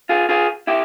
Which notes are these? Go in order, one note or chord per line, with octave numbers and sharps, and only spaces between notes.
F4 G#4
F4 G#4
E4 G4